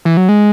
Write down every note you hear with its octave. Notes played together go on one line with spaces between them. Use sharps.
E3
F#3
G#3